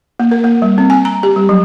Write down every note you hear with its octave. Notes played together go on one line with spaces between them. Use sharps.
A#3
A#4
A#3
G3
C4
G#5
A#5
G4
G3
F#3